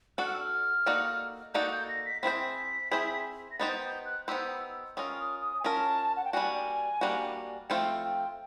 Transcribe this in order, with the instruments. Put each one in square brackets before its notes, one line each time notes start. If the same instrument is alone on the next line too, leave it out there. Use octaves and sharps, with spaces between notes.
[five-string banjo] D4 F#4 A4 [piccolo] F#6
[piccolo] F6
E6
F6
[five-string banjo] A#3 D#4 F#4 A4 D5
[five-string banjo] A#3 D#4 F#4 A4 D5 [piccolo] G6
[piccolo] G6
A#6
B6
[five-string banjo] C4 E4 G#4 C5 [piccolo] B6
[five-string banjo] C4 E4 G#4 C5
[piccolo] A#6
[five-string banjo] B3 D#4 G4 C5 [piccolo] A6
[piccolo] G6
F#6
[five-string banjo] B3 D#4 G4 C5 [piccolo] E6
[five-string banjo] C#4 F4 A#4 [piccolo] D#6
[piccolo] D#6
D#6
G#5
[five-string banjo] C#4 F4 A#4 [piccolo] A5
[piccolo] F#5
G5
[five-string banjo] G3 A#3 D4 F#4 [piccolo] G#5
[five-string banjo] G3 A#3 D4 F#4
[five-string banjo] F3 A3 C4 F4 A4 [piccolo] G5
[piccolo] G5